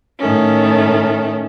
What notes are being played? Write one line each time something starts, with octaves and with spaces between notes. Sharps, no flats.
A2 D#3 A3 C#4